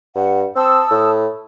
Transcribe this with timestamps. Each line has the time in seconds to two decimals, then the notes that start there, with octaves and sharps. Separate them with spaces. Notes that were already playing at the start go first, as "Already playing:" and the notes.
0.15 G2 F#5
0.56 C4 A5 D#6 E6
0.90 A2